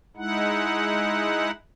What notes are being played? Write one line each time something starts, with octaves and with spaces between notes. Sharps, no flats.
G#3 D#4 E4 F#5